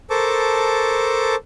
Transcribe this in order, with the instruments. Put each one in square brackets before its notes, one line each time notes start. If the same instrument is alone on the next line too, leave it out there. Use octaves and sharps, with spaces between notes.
[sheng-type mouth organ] A4 A#4 C5 A5 C#6 D6